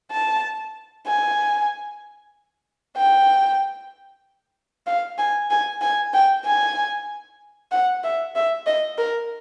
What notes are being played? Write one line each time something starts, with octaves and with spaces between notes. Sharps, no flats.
A5
G#5
G5
F5
G#5
G#5
G#5
G5
G#5
F#5
E5
E5
D#5
A#4